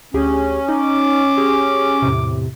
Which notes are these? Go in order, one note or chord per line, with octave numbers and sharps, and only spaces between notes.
D2 C#4 G4 G#4
D#4 D6
G4 G#4
E2 A2 C3